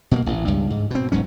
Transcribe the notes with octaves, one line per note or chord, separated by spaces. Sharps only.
B2 A3 A#3
A1
C#2 G2
G#2
B2 C4
E1 G#2 F#3 C#4